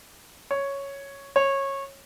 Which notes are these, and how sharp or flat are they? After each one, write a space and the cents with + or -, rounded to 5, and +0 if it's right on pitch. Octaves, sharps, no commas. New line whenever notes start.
C#5 +0
C#5 -20